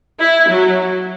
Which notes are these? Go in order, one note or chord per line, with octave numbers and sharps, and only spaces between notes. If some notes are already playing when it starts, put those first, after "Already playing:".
E4
F#3